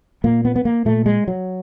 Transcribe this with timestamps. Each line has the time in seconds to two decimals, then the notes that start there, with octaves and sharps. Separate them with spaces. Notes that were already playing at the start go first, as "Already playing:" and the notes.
0.24 A#2 A#3
0.45 B3
0.56 B3
0.65 A#3
0.85 A#2 A3
1.06 G#3
1.28 F#3